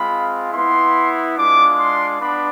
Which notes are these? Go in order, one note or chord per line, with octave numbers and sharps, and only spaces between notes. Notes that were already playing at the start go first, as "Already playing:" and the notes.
Already playing: G#3 C4 F4 B5
B3 E4 C6
G#3 D4 F4 D6
C6
B3 D4 B5